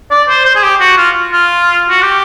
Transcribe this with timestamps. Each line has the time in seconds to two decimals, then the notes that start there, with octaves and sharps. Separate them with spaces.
0.11 D5
0.29 C5
0.45 C5
0.56 G#4
0.62 G4
0.80 F#4
0.97 F4
1.33 F4
1.90 F#4
2.02 G4